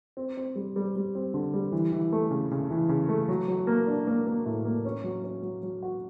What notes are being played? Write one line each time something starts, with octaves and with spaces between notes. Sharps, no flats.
C4
C4
G3
G3
G3
C4
D3
G3
E3
E3
A3
C#3
C#3
E3
C#3
A3
F#3
F#3
A#3
D4
A#3
A#3
A2
A#3
C#4
F#3
C#4
F#3
F#3
F#4